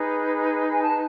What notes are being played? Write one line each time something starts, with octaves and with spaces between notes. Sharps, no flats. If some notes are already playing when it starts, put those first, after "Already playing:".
Already playing: D#4 G#4 B4
G#5
A5